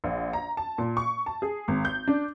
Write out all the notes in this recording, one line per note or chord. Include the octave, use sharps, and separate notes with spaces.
A#1
A#5
A5
A#2
C#6
A5
G#4
G#1
G6
D4